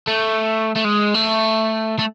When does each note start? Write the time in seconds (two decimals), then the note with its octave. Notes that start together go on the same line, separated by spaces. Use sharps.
0.07 A3
0.76 A3
0.84 G#3
1.14 A3
1.99 A3